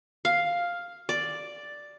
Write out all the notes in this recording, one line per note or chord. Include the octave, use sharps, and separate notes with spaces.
F5
D5